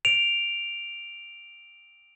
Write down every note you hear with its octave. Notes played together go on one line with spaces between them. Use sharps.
D7 F7